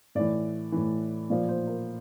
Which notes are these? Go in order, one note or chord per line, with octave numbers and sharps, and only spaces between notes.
A2 E3 D5
A2 E3
A#2 F3 D5
C5
A#4